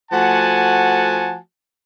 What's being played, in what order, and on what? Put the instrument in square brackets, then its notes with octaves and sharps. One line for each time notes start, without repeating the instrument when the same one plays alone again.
[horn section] F3 A3 F#4 F#5 G#5 A5